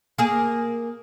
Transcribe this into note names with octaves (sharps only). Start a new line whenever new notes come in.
A#3 G#4